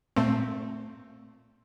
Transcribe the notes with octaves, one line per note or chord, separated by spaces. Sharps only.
A#2 A3 C4